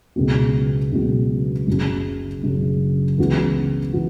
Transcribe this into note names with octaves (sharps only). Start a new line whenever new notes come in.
C#2 B2 F#3
C#2 B2 F#3
F#1 F#2 C#3 F#3
F#1 F#2 C#3 F#3
C#2 C#3 E3 B3 F#4
E3 F#4